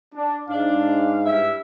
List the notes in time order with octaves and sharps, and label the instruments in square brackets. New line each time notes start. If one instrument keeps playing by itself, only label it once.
[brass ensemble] D4
[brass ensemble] G#2 D#4 F5 [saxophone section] D4
[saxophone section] G2 E4 E5